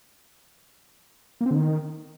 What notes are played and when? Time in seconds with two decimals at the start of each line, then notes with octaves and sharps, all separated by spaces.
1.41 A#3
1.46 C4
1.51 D3
1.56 D#3